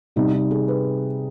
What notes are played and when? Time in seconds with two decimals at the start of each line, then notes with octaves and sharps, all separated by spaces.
0.16 C3 G3 D#4
0.33 D#4
0.51 G#4
0.68 B4